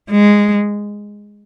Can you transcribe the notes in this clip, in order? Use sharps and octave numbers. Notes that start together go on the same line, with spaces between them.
G#3